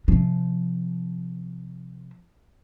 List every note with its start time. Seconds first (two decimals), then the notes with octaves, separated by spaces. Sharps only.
0.08 C3 F3